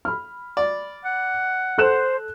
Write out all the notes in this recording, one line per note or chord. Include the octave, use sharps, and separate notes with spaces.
B5 F6
D5
F#5
A4 C5 F#6 E7